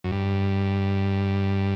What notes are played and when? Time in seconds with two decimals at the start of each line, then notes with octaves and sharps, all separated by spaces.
0.04 F#2
0.12 G2